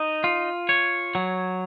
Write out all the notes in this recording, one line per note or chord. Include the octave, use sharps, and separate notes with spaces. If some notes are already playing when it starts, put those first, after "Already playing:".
Already playing: D#4
F4
C#5
F#3